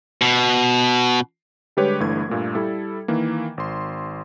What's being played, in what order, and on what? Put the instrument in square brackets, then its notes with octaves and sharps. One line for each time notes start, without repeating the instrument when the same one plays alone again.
[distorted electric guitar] B2
[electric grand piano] D3 G3 G#3 G4 B4 C#5
G1 G2 E3 A3 G#6
G2 A#2 A3 A#3
G3 E4 A4
D#3 E3 A#3
G#1 C6